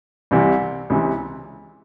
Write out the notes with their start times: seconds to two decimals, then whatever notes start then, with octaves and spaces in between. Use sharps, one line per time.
0.31 C2 C3 E3
0.90 C#2 C3 E3